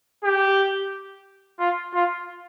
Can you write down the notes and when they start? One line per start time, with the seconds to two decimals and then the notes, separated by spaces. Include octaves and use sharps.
0.24 G4
1.59 F4
1.94 F4